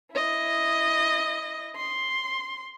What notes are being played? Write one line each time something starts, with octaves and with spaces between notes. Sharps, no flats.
E4 D#5
C6